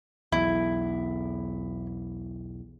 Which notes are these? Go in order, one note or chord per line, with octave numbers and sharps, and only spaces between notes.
B1 E2 E4